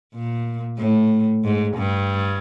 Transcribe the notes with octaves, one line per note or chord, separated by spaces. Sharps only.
A#2
A2
G#2
G2